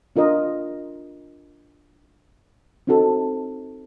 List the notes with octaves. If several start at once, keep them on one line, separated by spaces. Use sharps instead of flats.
D4 F4 A#4 D#5
C4 D#4 F#4 A4